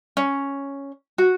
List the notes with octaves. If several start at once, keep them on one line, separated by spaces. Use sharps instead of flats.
C#4
F#4